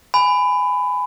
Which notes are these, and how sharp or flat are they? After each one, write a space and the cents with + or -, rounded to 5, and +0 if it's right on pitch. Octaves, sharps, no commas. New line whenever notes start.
G#5 +0 B5 +20